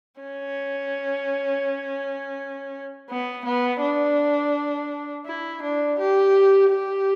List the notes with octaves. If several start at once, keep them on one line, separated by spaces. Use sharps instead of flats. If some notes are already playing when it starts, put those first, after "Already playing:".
C#4
B3
B3
D4
E4
D4
G4
G4